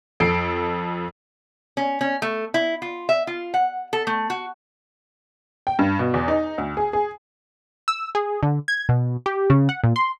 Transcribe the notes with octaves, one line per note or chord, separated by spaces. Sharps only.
F2 A4 C7 D7
C#4
C#4
A3
E4
F4
E5
F4
F#5
A4
A3
F#4
G5
G2
B2
E2
D#4
D2
G#4
G#4
E6
G#4
D3
G#6
B2
G4
C#3
F#5
A#2
C6